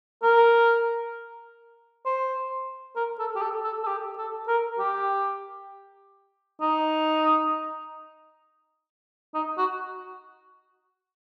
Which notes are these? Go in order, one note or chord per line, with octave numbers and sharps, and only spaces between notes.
A#4
C5
A#4
A4
G4
A4
A4
A4
G4
A4
A#4
G4
D#4
D#4
F#4